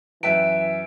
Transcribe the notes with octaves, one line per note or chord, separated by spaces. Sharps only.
F#2 E3 B4 E5 G5 A5 B6 D7